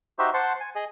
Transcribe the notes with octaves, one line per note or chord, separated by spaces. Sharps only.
D#4 F#4 G4 C5 E5
C5 F#5 A5 C6
G#5
G#4 D#5